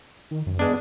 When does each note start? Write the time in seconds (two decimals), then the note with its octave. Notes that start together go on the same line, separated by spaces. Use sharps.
0.31 D#3
0.46 F#2
0.59 G#3 B3 D4